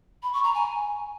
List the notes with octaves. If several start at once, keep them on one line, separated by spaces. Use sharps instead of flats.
B5
C#6
A#5
G#5